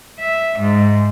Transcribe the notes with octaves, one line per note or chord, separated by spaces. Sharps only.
E5
G#2